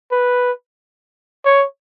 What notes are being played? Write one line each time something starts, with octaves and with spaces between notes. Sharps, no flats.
B4
C#5